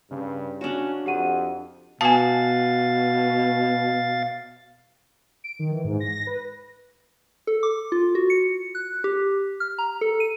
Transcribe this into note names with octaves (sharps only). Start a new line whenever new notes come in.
G2 C#3
C#4 D4 F#4
F2 G4 F#5 D#7
B2 F5 G#5 A5 A6
D7
D#3
E3
G#2
A#6
B4
A4
D6
F4
F#4
C#7
F#6
G4
F6
A#5
A4
D#7